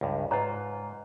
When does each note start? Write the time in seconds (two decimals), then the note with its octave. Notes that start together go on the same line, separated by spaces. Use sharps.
0.01 C#2 G2
0.31 G#2 F4 B4 C#5 A#5